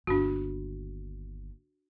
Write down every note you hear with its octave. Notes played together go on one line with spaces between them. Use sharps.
G1 D#2 D4 F#4